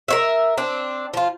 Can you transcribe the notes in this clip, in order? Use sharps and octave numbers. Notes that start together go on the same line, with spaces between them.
A#4 C#5 E5
C4 D4
F3 F4